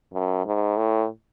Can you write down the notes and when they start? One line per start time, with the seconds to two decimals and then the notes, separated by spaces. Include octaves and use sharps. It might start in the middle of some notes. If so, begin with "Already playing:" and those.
0.14 F#2
0.46 G#2
0.77 A2